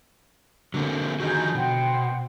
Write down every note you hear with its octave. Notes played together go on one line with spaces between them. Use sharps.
D3 F#3 A#3 C4
D#3 F3 D#4 F#4 G#4 G6
B2 C5 F#5 G5